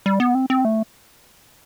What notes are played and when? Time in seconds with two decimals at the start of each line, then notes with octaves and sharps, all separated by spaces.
0.06 G3
0.20 B3
0.35 C4
0.50 C4
0.65 A3